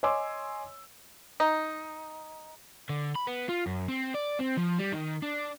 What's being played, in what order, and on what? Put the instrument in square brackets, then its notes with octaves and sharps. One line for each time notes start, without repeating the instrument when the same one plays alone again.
[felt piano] C#5 D#5 G#5 C6 D6 E6
[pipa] D#4
[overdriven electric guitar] D3
B5
B3
F4
F#2
C4
D5
C4
F3
G3
D#3
D4